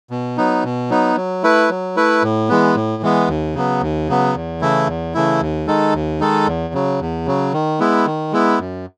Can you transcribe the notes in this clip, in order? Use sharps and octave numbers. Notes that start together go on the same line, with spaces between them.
B2
F#3 B3 D#4
B2
F#3 B3 D#4
F#3
A3 E4 B4
F#3
A3 E4 B4
A2
E3 G#3 B3
A2
E3 G#3 B3
D#2
C#3 F#3 B3
D#2
C#3 F#3 B3
E2
C#3 E3 A3 E4
E2
C#3 E3 A3 E4
D#2
D#3 G#3 D#4 A4
D#2
D#3 G#3 D#4 A4
E2
C#3 F#3
E2
C#3 F#3
D#3
G#3 B3 E4
D#3
G#3 B3 E4
F#2